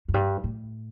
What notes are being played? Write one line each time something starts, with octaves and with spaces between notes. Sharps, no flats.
F#2
G2
A2